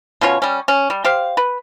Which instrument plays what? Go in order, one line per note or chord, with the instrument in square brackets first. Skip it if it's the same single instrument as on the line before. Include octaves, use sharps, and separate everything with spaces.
[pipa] B2 C#4 F4 C#5
G3 C#4
C#4
G3
G4 C5 F5
B4